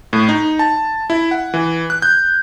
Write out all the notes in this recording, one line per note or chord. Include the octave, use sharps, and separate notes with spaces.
A2
D#4
A5
E4
F#5
E3
F#6
G6